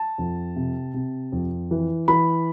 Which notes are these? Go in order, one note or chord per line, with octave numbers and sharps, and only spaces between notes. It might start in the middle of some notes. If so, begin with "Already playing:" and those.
Already playing: A5
F2
C3
C3
F2
E3
E3 B5